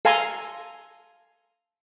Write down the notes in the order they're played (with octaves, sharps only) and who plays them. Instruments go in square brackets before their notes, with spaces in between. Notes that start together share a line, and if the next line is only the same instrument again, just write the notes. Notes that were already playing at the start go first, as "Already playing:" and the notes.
[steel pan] A4 F5 G#5 A#5 C6